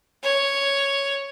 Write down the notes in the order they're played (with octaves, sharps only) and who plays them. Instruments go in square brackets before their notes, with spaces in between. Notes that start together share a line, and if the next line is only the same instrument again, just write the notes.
[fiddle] C#5